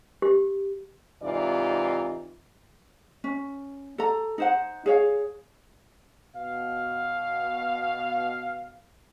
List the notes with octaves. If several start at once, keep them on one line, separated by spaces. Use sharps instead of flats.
G4
G#2 C3 E3 D#4 F4 D5
C#4
A4 A#5
D#4 C5 F#5
G#4 C#5 F5
B2 F5